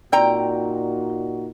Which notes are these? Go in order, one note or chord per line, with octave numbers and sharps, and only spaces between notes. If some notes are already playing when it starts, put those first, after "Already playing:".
A#2 C4 D#4 F#4 D5 G5 A#5